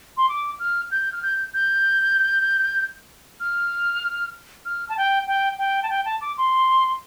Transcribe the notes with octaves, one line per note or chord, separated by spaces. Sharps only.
C6
D6
F6
G6
F6
G6
G6
F6
F6
A5
G5
G5
G5
A5
G5
A5
D6
C6